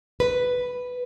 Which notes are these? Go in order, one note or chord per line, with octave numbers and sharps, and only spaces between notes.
B4